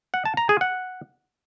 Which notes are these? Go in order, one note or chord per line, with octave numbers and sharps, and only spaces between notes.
F#5
A5
A#5
G#4
F#5